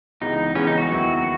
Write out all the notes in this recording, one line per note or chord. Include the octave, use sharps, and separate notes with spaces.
C#2 C#3 E3 B3 D#4
C#2 C#3 E3 B3 C#4
D#4
F#4
D#2 D#3 F#3 B3 E4